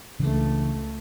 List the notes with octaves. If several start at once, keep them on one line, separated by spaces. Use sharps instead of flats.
C#2 C#3 E3 A3 D4